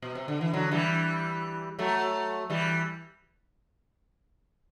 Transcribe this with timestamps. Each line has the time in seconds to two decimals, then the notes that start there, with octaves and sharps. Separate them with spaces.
0.02 B2
0.15 C3
0.28 D3
0.41 E3
0.54 D3 F#3
0.71 E3 G3
1.79 F#3 A3
2.50 E3 G3